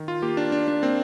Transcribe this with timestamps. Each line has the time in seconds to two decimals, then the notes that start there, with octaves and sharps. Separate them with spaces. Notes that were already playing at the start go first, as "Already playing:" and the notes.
Already playing: D#3
0.08 F4
0.22 A#3 G4
0.37 D4
0.52 A#3 D4
0.68 D4
0.82 A#3 C4